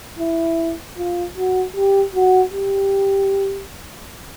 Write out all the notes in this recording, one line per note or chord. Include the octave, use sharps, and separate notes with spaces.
E4
F4
F#4
G4
F#4
G4